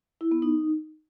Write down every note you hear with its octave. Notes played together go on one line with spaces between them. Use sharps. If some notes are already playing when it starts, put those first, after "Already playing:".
E4
B3
D#4